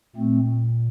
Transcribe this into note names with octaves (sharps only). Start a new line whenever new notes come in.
A#2 A3 C4